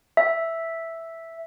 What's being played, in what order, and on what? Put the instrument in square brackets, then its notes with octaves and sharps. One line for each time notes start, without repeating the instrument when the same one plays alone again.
[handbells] E5